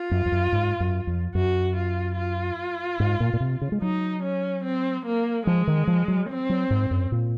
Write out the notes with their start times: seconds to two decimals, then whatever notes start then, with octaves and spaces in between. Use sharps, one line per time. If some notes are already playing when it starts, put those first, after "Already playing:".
Already playing: F4
0.11 F#2
0.26 F2
0.32 F#2
0.52 G#2
0.80 F#2
1.07 F2
1.35 F#2 F#4
1.76 F4
2.17 F4
3.00 G#2
3.20 A#2
3.34 A#2
3.40 C3
3.61 C#3
3.72 G#3
3.82 F#3 D#4
4.23 C#4
4.65 C4
5.06 A#3
5.47 F3 G#3
5.67 D#3
5.87 F3
6.08 F#3
6.29 C4
6.49 F#3
6.70 G#2
6.91 F#2
7.12 A#2